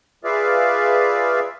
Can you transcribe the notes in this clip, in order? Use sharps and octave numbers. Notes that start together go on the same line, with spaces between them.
F4 G#4 B4 D5 E5 F5